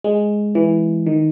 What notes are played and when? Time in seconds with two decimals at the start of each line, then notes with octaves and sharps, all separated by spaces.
0.04 G#3
0.55 E3
1.06 D#3